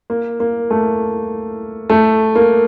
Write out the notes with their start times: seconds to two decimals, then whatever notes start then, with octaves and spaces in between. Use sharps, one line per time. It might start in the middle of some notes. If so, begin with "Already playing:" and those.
0.10 A#3
0.40 A#3
0.70 A3
1.90 A3
2.35 A#3